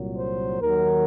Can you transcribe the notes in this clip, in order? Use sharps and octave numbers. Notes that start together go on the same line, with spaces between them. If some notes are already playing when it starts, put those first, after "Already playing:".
Already playing: C2 A#2 F#3
C5
D#2 D#3 F#3 A#4